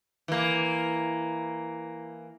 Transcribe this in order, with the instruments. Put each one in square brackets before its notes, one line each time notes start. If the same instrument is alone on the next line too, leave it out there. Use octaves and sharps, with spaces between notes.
[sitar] E3 A#3